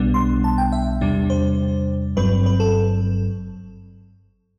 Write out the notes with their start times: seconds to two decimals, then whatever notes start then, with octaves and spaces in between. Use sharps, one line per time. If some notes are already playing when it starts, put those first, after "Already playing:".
Already playing: B1 B2 G3 B3 D4
0.14 C6
0.44 A5
0.58 G5
0.72 E5
1.01 E2 C3 G3 D4
1.30 C5
2.16 G1 G2 F#3 C4 B4
2.46 B4
2.60 A4